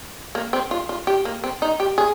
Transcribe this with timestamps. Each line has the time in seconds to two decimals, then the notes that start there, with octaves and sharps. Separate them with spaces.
0.35 A#3
0.53 C4
0.71 F4
0.89 F4
1.07 G4
1.25 A#3
1.44 C4
1.62 D#4
1.80 G4
1.98 G#4